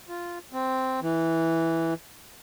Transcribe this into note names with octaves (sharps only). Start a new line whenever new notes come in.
F4
C4
E3